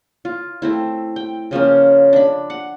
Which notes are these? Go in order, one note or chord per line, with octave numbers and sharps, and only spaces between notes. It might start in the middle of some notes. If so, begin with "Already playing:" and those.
F4
A3 C4 E4
G5
C#3 F3 A#3 C#4
D4 B5
F#5